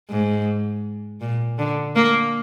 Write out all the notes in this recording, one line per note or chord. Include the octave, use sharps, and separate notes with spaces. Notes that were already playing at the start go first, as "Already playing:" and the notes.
G#2
A#2
D3
A#3